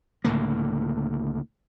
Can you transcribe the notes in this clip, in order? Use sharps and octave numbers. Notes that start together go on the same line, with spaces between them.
C#2 A2 D3 A#3